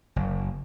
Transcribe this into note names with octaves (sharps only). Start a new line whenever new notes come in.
F#1